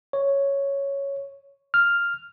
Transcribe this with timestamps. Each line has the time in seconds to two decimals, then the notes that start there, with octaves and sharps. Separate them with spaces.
0.13 C#5
1.74 F6